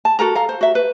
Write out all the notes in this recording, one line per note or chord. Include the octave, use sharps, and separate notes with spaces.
A5
F#4 A4 A#4 A#5
A4 F5 A#5
C5
F#4 E5
B4